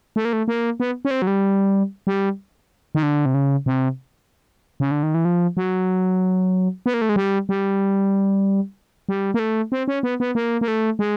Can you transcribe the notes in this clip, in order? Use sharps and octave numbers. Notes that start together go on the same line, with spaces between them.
A3
A#3
A3
A#3
B3
C#4
C4
F#3
G3
G3
D#3
D3
C3
C#3
C3
C#3
D3
D#3
E3
F3
F#3
B3
A#3
A3
G#3
G3
G3
G3
A#3
A3
C4
C#4
B3
B3
A#3
A#3
A3
G#3